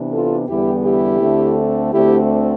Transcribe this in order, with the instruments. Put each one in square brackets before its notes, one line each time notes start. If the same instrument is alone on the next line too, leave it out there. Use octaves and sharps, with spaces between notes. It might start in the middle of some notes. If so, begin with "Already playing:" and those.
Already playing: [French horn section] C3 E3 B3 D4
F4 A4
E2 D3 G3 B3 E4 G4
E4 G4
D2 D3 A3 C4
D2 D3 A3 C4 E4 G4